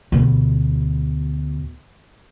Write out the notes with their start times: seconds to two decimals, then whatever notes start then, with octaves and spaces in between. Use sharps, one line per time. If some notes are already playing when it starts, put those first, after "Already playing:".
0.12 D2 B2